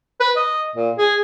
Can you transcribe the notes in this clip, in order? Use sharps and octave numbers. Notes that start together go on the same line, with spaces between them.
B4
D#5
A#2
G#4